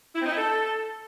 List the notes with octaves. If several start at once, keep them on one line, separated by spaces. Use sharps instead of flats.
E4
C4
D#4
E4
A4